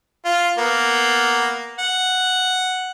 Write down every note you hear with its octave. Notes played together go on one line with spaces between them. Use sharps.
F4
A#3 B3
F#5